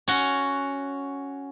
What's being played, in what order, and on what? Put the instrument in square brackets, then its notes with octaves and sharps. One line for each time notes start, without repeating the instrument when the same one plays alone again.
[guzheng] C#4 F#4